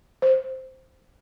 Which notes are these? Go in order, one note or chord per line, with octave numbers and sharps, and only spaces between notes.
C5